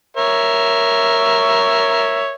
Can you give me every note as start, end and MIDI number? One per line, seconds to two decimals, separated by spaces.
0.17 2.35 70
0.17 2.35 73
0.17 2.35 76